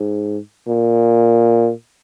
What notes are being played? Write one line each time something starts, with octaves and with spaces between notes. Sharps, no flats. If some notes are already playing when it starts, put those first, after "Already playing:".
Already playing: G#2
A#2